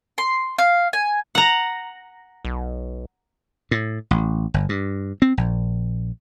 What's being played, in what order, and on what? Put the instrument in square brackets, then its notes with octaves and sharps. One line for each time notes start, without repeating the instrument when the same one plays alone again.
[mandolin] C6
F5
G#5
[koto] F#5 A#5
[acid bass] B1
[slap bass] A2
A1
G1
G2
C4
A#1